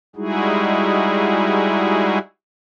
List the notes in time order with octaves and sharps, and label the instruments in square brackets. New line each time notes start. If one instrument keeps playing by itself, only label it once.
[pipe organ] G3 G#3 D#4 E4 F#4 G#4